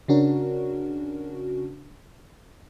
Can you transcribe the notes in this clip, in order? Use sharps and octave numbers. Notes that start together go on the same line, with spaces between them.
C#3 C#4 D4 F#4 A#4